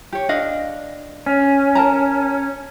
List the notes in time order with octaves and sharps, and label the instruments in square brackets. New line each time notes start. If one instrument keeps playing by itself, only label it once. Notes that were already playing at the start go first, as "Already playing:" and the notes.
[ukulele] G4 C#5
D4 D#5 F5
[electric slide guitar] C#4
[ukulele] A#4 A5 A#5